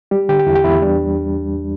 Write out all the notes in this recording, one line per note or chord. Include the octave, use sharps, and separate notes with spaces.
G3 G4
D3 G4
G4
E2 E4
G4
E2 E4
G3 D4